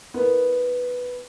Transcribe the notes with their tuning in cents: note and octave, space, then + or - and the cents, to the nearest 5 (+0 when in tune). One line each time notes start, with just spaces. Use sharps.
B3 +0 E4 -30 A#4 +0